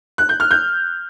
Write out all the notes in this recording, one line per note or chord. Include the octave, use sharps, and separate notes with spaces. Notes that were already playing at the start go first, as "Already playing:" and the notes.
F#6
G6
F6
G6